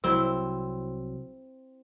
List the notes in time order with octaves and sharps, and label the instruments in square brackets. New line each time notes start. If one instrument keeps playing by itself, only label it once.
[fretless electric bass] C2 F#3 [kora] C4 E4